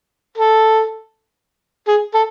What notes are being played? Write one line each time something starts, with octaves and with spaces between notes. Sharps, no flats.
A4
G#4
A4